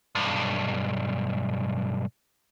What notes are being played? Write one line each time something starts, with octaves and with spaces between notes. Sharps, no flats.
B1 G2